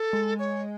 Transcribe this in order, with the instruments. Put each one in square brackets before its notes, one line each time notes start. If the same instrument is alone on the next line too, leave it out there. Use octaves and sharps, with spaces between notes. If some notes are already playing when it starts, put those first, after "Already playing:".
Already playing: [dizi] A4
[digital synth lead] G#3
[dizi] C#5